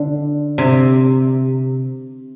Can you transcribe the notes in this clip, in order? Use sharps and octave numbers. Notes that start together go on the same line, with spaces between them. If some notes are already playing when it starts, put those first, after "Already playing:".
Already playing: D3
C3